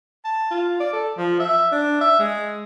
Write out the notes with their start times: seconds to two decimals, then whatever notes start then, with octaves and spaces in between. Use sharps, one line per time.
0.25 A5
0.51 F4
0.80 D5
0.93 A4
1.18 F3
1.40 E5
1.72 D4
2.01 E5
2.19 G#3